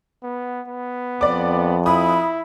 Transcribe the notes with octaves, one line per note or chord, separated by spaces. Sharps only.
B3
B3
F2 D5 D6
E4 B5 D#6